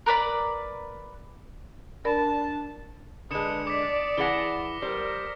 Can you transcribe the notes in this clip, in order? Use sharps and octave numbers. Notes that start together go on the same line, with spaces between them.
A#4 B4 D5 B5
D4 A#4 D5 A5 B5
D3 G#3 B4 D#6 C#7 E7
D5 D6 B6
E3 G#4 F#5 A#6 B6 G7
G3 A#4 C5